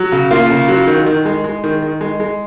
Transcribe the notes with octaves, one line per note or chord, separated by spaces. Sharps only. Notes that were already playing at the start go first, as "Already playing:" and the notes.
Already playing: F#3
C#3
A#3 F4
C#3
F#3
D#3
D#3
G#3
G#3
D#3
D#3
G#3
G#3